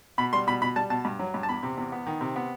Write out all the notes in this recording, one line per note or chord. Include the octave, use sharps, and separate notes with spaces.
B2 B5
G3 C6
B2 B5
B2 B5
G3 A5
B2 A5
G2
F#3
G2
A5
E2 B5
C3
E2
B3
D#3
C3
B3